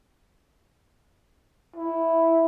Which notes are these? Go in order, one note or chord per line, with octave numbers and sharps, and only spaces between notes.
E4